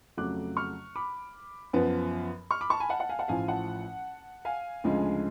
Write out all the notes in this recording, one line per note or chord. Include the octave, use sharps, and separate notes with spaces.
F2 C#3 F#3 A3 D6 F#6
C#6 F6
B5 D6
F#2 F3 B3
C#6 F6
B5 D6
A5 C#6
G#5 B5
F#5 A5
F#5 A5
F5 G#5
F#5 A5
A1 A2 F3 F5 G#5
F#5 A5
F5 G#5
D2 C#3 F3 G#3